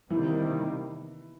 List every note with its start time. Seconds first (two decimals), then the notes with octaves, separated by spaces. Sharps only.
0.10 C3 D#3 E3 G3 A#3